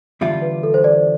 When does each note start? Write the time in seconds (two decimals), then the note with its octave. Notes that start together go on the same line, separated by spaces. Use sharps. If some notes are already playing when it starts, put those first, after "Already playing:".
0.21 E2 D3 G3 D4 F4 E5
0.42 B4
0.63 A4
0.74 C5
0.84 D5